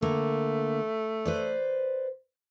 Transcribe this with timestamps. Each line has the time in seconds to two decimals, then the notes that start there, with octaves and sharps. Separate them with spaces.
0.02 D3 A3 A#3
1.25 B4 C5 D5